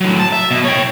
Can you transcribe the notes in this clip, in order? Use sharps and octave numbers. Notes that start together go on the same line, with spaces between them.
A2 F#3
A5
E5
B2
C#5 G5